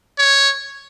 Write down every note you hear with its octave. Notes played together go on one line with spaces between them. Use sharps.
C#5